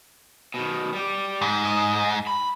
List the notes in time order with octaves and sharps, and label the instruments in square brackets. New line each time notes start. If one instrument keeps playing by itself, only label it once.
[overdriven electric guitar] B2 D#3
G3 G4
[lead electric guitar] G#2
[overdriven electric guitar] D#5
B5